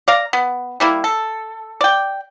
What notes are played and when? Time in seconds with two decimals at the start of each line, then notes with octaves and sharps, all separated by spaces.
0.08 D5 F5 A#5
0.33 B3
0.80 G3 A#3 E4
1.04 A4
1.81 D5 G5